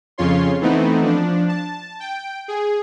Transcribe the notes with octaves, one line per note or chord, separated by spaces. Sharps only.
F2 C#3 F4 C#5 C6
E3 A3 B3 C4 D#4
F3 D4
A5
G5
G#4